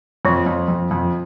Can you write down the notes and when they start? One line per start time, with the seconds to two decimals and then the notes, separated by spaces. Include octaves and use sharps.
0.25 F2 F3
0.46 F2
0.68 F2
0.91 F2